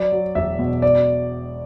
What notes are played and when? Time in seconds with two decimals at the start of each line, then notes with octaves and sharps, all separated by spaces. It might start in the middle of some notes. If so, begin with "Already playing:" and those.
Already playing: F#3 D5
0.12 F#3
0.35 E1 E5
0.59 B2
0.82 D5